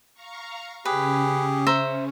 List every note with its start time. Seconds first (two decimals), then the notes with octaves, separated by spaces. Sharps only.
0.14 F5 A#5 C#6
0.85 C#3 C#4 G4 G#4 B4
1.67 C5 E5 A#5